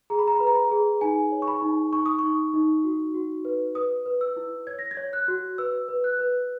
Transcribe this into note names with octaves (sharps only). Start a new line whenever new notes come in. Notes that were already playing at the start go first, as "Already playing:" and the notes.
G#4 A#5
B5
A#5
B4 B5
A#5
B5
A#5
G#4
D#4 G#5
C#5
C#6
B5
D#4
D#4 C#6
D#6
D#4 C#6
D#4
F#4
F#4
B4
B4 D#6
B4
E6
E4
C#5 G#6
A#6
G#6
C#5
F#6
F#4
B4 E6
B4
F#6
B4